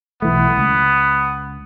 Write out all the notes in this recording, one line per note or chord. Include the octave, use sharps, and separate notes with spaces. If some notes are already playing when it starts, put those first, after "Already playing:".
B1 E3 A3 B3
C#2